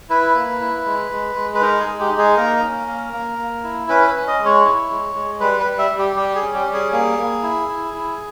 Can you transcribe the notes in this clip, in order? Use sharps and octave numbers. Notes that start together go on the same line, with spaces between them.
E4 B4
A#3
E4
G#3
G#3
G#3
B4
D#4 A#4
G#4
G#3
G4
D#4
G#4
A#3 A#4
C#4
A#3
A#3
A#3
E4
C#4 B4
B4
C#4
D#5
G#3
C#5
E4
G#3
G#3
G3 B4
B4
G3
E5
G3
G4
G3 G4
G#4
C#4
G4
G3
G#4
A#3 G#4
A#3
E4
E4
E4